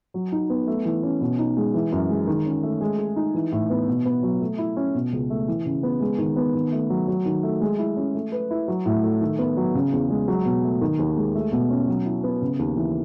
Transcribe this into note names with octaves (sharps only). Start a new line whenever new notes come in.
F#3
D#4
B3
A3
E3
C#4
B2
D#4
G#3
E3
F#2
G#3
D#3
C#4
A3
G#3
G#4
D#4
E3
A2
B3
B2
B3
F#3
A3
E4
C#4
B2
C#2
A3
E3
C#3
B3
G#3
D#3
B3
D#3
A3
F#3
F#3
D#3
A3
G#3
E4
C#4
A3
B4
E4
F#3
A2
A3
D#3
B3
F#3
C#3
E2
G#3
F#3
B2
A3
D#3
D#2
G#3
A3
B2
C#4
F#3
E4
B3
C#3
D#2
E3